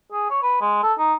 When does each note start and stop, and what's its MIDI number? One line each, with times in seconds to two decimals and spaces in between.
0.12 0.26 68
0.30 0.38 73
0.42 0.56 71
0.61 0.81 56
0.83 0.93 69
0.99 1.14 63